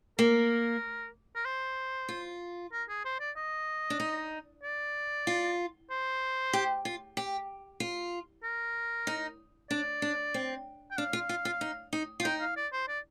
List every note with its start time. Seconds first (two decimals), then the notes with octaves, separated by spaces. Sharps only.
0.18 A#3 A#4
1.35 A#4
1.45 C5
2.09 F4
2.72 A#4
2.89 G#4
3.05 C5
3.20 D5
3.36 D#5
3.90 D4
4.00 D#4
4.63 D5
5.27 F4
5.90 C5
6.53 G4
6.85 F4
7.17 G4
7.80 F4
8.43 A#4
9.07 D#4
9.70 D4 D5
10.02 D4
10.34 C4
10.91 G5
10.98 D4 F5
11.13 F4
11.29 F4
11.45 F4
11.61 D#4
11.93 D#4
12.20 F4
12.24 D#4 G5
12.41 F5
12.56 D5
12.73 C5
12.88 D5